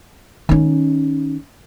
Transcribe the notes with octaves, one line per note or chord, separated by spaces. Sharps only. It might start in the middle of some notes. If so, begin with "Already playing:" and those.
D#3 C#4 D#4